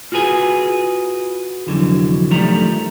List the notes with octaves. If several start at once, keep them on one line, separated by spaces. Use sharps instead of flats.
F4 F#4 G#4 B4 G#5
C2 F2 D3 E3 F#3
F#2 D#3 F3 G3 A3 A#5